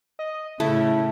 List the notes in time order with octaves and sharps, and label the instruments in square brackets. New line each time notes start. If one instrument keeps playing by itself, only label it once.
[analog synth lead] D#5
[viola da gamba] A2 C#3 [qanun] A3 [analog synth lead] E4